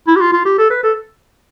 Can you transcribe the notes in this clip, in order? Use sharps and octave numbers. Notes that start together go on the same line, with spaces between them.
E4
G4
F4
F4
G4
A4
B4
A4